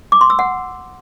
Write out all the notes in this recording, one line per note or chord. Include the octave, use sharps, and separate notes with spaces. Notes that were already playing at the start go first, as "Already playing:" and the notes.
D6
C6
E6
F#5